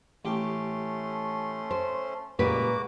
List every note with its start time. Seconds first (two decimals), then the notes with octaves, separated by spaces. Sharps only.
0.25 A1 A3 C#4 G4 G5 C6
1.71 C5
2.39 C#2 A#2 G3 A#3 F#4 B4 D6